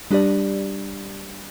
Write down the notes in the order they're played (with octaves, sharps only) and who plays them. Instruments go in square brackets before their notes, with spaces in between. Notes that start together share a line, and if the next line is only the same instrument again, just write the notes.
[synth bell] G3 D4 G4 D5